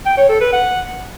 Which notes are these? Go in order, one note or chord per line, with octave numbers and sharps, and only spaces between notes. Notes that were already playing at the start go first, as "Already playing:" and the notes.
G5
C#5
A4
B4
F#5